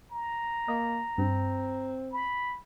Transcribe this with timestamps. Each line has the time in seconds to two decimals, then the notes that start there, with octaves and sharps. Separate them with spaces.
0.12 A#5
0.68 A#3 D#5
1.18 G2 C4
2.13 B5